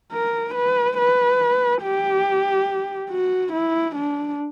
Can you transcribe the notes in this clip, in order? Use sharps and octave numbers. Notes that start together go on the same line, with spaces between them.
A#4
B4
B4
G4
F#4
E4
D4